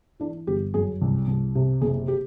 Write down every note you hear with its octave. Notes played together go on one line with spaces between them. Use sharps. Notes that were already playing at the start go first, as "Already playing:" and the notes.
E3 D4
G1 G4
F#2 G#4
C2
C2
C3
F#1 G#4
G4